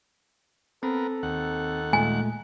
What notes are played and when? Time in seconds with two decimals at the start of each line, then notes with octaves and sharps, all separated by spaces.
0.83 B3 C4 A4 A#4
1.23 D#2 F#5
1.93 A#2 G#3 A3 G#5